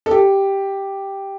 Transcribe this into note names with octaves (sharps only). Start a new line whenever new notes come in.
A4
G4